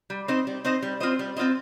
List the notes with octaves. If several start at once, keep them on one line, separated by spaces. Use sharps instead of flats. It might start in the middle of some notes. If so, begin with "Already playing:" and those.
G3
C4 D#4 C5 D#5
G3
C4 D#4 C5 D#5
G3
C4 F4 C5 D#5
G3
C4 F4 C5 D#5